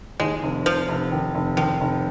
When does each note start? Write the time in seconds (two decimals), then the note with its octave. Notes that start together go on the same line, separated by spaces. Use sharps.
0.20 D#2 G#3
0.43 F1
0.66 F1 F3
0.89 F1
1.12 D#3
1.35 F1
1.57 D#3 F3
1.81 F1